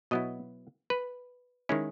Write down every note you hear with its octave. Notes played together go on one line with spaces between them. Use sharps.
B2 F#3 B3 E4 D#5
B4
D#3 G#3 C#4 E4